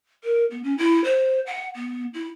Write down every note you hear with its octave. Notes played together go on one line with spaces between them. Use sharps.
A#4
B3
C#4
E4
C5
F#5
B3
E4